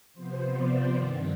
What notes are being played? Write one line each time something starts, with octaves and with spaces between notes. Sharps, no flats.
C3 F3 B3 C5
D5
G2 D#3 G3 C4